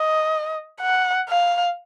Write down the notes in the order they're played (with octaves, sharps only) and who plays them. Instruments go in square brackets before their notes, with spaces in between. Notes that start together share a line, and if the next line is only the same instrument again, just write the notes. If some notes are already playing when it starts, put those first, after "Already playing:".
Already playing: [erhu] D#5
F#5
F5